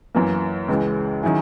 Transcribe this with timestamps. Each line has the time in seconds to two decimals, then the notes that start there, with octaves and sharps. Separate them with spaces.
0.15 F#2 E3 A#3
0.68 C#2 C#3 E3 G#3
1.23 D#3 F#3 C#4 E4 G#4